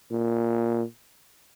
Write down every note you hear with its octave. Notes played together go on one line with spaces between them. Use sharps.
A#2